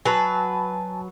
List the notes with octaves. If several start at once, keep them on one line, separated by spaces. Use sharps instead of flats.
F#3 B4 G#5 A5